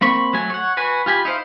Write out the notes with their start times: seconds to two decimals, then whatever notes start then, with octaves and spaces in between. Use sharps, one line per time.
0.01 A#3 C4 B5 C#6
0.33 F#3 A3 G#5
0.50 C#5 F#5
0.77 F#4 B4 G#5
1.06 F4 G4 G#5 B5
1.25 D#4 E4 C5 F5